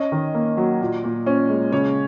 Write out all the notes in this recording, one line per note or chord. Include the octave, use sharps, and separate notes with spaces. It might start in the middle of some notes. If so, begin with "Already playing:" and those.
Already playing: C#4 D#5
D#3
A#3
F#3
A#2
A#2
C#4
G#3
C#3 C#5